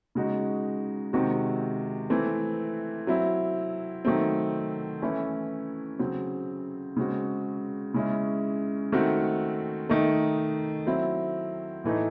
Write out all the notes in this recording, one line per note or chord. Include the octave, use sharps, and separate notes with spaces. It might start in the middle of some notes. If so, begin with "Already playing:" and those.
C#3 G#3 D#4 F#4
C3 D#3 G#3 C4 F#4
E3 A3 C4
F#3 C4 E4
D#3 F#3 A3 C4
E3 A3 C#4 E4
C#3 F#3 C4
C#3 G#3 C4 F#4
C#3 G#3 C#4 E4
D#3 A3 C4 F#4
D#3 A3 D#4
F#3 C4 E4
A2 E3 A3 D#4